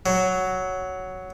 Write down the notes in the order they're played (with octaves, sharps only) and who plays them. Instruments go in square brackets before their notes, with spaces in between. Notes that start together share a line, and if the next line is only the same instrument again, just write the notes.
[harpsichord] F#3